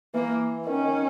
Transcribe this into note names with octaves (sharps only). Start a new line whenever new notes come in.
E3 A#3
D#3 C#4
D#3